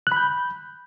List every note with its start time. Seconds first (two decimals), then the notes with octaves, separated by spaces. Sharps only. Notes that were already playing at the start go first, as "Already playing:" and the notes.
0.07 F#6
0.12 B5
0.16 G6